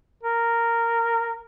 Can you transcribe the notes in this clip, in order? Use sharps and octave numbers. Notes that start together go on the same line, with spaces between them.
A#4